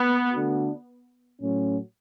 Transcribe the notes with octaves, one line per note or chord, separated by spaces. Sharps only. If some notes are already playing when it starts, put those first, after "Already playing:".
Already playing: B3
D3 A3 D4 F#4
A2 F#3 C#4